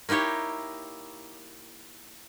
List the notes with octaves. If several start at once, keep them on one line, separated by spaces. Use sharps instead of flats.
A#3 D#4 E4 G4 C#5